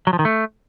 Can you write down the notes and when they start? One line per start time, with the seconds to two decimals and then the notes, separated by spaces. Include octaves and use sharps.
0.07 F#3
0.13 F3
0.19 D#3
0.25 A3